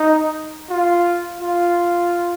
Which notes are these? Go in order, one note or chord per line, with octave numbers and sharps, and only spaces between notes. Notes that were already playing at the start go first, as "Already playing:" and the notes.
Already playing: D#4
F4
F4